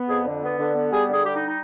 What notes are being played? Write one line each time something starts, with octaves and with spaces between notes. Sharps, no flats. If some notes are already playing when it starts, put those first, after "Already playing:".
Already playing: B3
F2 G#4
D3
B3
D3
B3
G3 G#4
D3
G#4
G3 G4
D#4
D#4